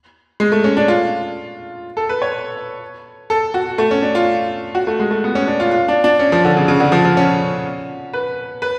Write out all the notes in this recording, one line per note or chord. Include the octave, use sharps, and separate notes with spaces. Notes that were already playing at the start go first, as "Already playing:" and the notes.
G#3
A3
C#4
D4
F4
A4
B4
C#5
A4
F#4
A3
C#4
D4
F4
F#4
A3
G#3
A3
B3
C#4
D4
F4
F4
D4
D4
C#4
F3
D3
C#3
C#3
D3
F3
F3
C#4
B4
B4